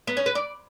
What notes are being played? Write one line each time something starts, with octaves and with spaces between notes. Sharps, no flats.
B3
C#4
B4
D5